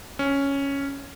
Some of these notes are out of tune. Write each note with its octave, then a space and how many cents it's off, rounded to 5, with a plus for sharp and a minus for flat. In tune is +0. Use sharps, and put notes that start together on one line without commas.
C#4 +0